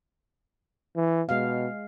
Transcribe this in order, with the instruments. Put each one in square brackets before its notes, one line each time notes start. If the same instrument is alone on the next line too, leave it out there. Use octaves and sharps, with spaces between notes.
[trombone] E3
[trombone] B2 [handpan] G#3 F5